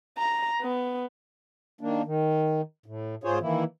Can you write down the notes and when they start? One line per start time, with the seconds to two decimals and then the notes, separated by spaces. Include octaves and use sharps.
0.18 A#5
0.62 B3
1.81 D#3 A#3 D4
2.05 D#3
2.86 A2
3.24 G#2 F4 G#4 C5 C#5
3.41 D#3 E3 A#3 E4